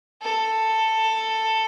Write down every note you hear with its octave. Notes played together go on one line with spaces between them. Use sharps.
A4